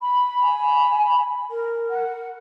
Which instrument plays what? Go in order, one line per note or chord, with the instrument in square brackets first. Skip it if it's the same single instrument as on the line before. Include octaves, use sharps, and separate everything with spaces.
[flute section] B5
[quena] G#5
A#4
[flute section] F#5